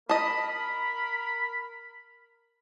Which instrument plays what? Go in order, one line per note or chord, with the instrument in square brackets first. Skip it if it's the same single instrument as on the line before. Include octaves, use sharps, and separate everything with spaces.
[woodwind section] A#4 B5 [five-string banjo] D#5 A5